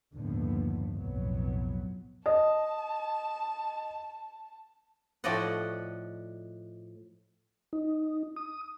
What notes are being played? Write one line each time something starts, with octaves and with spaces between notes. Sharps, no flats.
G1 D#2 A2 D3 F3 B3
B1 F2 A2 F#3 B3
D#5 A5
A2 F3 F#4 D5 D#5 F#5
D#4
D#6